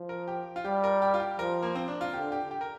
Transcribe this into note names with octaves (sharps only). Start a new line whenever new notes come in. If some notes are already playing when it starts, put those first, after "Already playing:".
Already playing: F3
A#4
G4
F4
G3 G4
A#4
G4
F4
G4
F3 A#4
A#3
C4
D4
F4
D3 G4
G4
G4
A#4